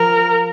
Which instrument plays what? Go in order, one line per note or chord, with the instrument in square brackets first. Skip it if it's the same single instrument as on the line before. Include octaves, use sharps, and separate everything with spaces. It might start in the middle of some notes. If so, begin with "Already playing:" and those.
Already playing: [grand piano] F3 [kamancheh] A#4